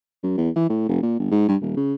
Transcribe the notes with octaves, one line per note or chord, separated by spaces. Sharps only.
F#2
E2
E3
A2
F1
A#2
G1
G#2
G2
D#1
C#3